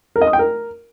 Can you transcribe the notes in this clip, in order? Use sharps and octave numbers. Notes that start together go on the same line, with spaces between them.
A#4
D#5
D#6
G5
A#4